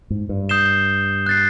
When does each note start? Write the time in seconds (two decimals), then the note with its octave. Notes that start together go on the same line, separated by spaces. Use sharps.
0.10 G#2
0.29 G2
0.49 D#6 G6 C7 E7 G7
1.26 F#6 A6 C7